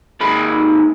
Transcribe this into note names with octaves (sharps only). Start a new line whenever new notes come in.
D#2 G#2 G#3 B5